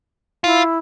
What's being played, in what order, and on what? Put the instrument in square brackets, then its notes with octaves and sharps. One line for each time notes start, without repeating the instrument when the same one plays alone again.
[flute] E4 [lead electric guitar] F4